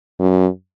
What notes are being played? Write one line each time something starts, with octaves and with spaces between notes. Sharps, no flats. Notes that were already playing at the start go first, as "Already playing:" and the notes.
F#2